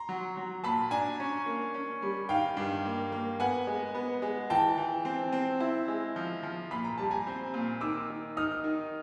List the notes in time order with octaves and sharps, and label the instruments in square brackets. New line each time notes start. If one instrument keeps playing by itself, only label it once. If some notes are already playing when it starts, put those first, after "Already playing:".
Already playing: [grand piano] A#5 C6
[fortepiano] F#3
F#3
[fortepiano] A#2 [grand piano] A5 B5
[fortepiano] D4 [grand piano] G#5 A#5
[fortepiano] C#4
A#3
C#4
G3
[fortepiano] D#3 [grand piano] F5 G5
[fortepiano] G2
A#3
A#3
[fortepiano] B3 [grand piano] F#5 G#5
[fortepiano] G#3
B3
G#3
[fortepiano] E3 [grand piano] G5 A5
[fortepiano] E3
C4
C4
E4
G#3
F3
F3
[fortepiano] A#2 [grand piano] B5
[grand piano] A#5
[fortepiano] G3 [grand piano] A5
[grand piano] G#5 A#5
[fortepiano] C4
A#2
[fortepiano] D#3 [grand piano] D6 E6
[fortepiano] D#3
[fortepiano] D#4 [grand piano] D#6 F6
[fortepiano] D#3